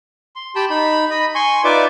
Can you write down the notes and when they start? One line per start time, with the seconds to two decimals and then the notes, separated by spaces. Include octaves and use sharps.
0.36 C6
0.56 G4 G5 A5 B5
0.70 D#4 B5
1.10 D#5 B5
1.35 G#5 C6 C#6
1.64 D#4 F4 B4 D5 E5 D6